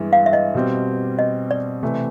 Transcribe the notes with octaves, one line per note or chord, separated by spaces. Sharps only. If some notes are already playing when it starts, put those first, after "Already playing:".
Already playing: G2 E3 G#3 B3 E4
F5
E5
D#5
B2 G3 C4
D#5
D5
C3 E3 A3 C4